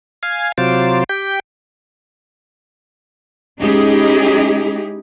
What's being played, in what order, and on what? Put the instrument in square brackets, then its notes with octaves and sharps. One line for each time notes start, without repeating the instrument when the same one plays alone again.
[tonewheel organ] F5 G#5
C3 F#3 F4 C5 D6
G4 G5
[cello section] G#3 C#4 D#4 E4 G4 G#4